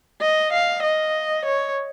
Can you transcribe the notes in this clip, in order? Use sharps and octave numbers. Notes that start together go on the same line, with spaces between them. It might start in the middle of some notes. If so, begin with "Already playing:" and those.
D#5
F5
D#5
C#5